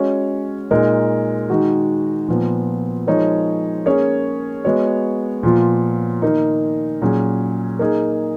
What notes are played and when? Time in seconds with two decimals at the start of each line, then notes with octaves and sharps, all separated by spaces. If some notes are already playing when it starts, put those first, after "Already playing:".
Already playing: G#3 C#4 F#4 C#5
0.71 A#2 G#3 D#4 A#4
1.50 D#3 G#3 D#4 F#4
2.28 A#2 F3 B3
3.07 F3 G#3 D#4 A#4 C#5
3.86 A#3 C#4 G#4 C#5
4.65 G#3 B3 F#4 C#5
5.43 A#2 F3 B3 F4
6.22 D#3 A#3 D#4
7.02 A#2 F#3 C#4 G#4
7.79 A#3 D#4 G#4